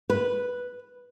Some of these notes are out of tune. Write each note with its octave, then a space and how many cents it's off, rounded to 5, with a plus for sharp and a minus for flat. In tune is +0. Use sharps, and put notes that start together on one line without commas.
B4 -5